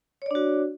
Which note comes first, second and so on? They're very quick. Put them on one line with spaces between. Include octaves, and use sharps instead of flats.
C#5 D5 D4 F#4